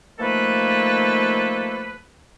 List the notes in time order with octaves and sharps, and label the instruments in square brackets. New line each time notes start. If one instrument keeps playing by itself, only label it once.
[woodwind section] D#3 F3 A3 A#3 A4 B4